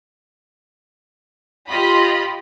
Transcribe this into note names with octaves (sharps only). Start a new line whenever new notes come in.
F4 G4 D#5 B5